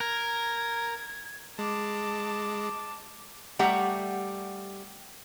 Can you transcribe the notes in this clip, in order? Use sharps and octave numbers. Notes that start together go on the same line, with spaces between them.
A#4 G#6
G#3 A5 D6
G3 A3 G4 F#5 A#5